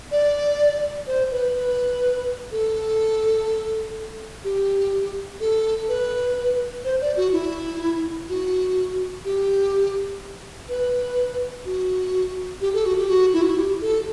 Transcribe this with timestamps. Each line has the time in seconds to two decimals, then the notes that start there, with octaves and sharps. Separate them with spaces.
0.12 D5
1.07 C5
1.31 B4
1.55 B4
2.52 A4
4.44 G4
5.40 A4
5.88 B4
6.84 C5
7.01 D5
7.17 F#4
7.32 E4
8.29 F#4
9.25 G4
10.69 B4
11.66 F#4
12.61 G4
12.74 A4
12.86 F#4
12.98 G4
13.09 F#4
13.33 E4
13.42 F#4
13.50 E4
13.57 G4
13.81 A4